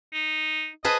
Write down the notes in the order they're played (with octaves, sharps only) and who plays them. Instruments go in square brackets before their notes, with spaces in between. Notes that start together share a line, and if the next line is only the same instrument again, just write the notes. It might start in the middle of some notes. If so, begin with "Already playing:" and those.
[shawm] D#4
[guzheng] G#4 B4 A5 [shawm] D#5